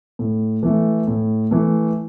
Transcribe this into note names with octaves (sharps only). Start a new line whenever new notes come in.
A2
E3 A3
A2
E3 A3